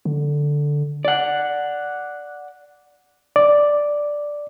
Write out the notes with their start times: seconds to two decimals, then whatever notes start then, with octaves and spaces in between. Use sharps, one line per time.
0.05 D3
1.05 D5 F#5
3.36 D5